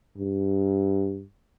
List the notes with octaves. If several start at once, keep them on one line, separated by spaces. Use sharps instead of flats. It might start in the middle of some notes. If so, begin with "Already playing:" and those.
G2